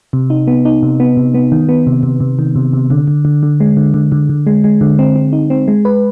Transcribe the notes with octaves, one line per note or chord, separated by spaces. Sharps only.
C3
D#4
B3
D#4
C3
B3
C3
B3
D#3
B3
C3
C3
C3
D#3
C3
C3
D3
D3
D3
D3
G#3
D3
D3
D3
D3
G#3
G#3
D3
C4
C4
D#4
C4
G#3
B4